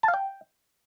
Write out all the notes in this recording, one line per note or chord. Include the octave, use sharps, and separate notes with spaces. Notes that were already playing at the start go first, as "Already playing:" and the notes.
A5
F5
G5